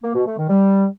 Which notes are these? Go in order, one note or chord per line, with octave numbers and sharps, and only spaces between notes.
A#3
B2
A3
D#3
G3